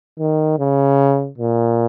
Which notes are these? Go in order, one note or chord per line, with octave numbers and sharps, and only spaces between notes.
D#3
C#3
A#2